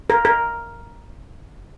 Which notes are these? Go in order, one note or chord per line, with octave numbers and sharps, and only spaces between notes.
A#4
A#4